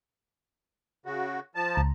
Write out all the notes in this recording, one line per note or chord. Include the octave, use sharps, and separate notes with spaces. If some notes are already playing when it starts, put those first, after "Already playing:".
C#3 F#4
F3 A5
C#2 A#5